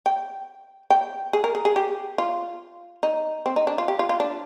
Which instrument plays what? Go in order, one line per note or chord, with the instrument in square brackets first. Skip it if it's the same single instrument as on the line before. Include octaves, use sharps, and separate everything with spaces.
[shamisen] G5
G5
G#4
A#4
G#4
G#4
G4
F4
D#4
C4
D#4
D4
F4
G4
F4
F4
D4